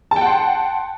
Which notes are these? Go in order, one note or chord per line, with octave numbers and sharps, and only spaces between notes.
F#5 G5 A5 C6